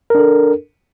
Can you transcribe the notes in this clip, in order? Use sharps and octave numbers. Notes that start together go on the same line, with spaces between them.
D4 A4 A#4